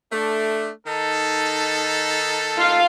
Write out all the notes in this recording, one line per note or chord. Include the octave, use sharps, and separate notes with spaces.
A3 D4
D#3 D#4 A4
F4 F5